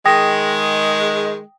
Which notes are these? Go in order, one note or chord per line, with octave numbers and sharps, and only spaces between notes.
D#3 G#3 G5 D#6 A#6